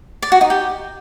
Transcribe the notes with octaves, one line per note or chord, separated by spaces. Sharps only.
D5
F#4
D#4
G4